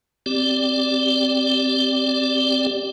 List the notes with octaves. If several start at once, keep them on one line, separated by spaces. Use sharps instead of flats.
C4 G4 D5